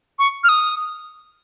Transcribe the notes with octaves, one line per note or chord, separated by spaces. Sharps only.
C#6
F6
D#6